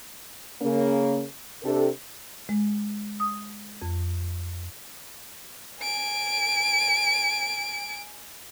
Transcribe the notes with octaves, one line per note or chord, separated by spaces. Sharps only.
C#3 A#3 C#4
C3 D4 G4 A4
G#3
D#6
F2
G#5 D7